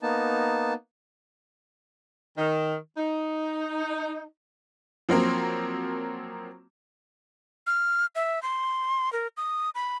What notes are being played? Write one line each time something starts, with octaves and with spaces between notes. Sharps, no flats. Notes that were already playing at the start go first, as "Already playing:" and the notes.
A#3 B3 D#4 A5
D#3
D#4
F3 F#3 A#3 C4
F6
E5
C6
A#4
D#6
B5